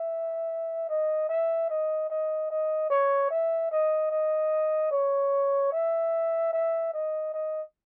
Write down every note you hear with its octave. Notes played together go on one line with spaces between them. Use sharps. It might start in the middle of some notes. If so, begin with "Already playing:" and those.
Already playing: E5
D#5
E5
D#5
D#5
D#5
C#5
E5
D#5
D#5
C#5
E5
E5
D#5
D#5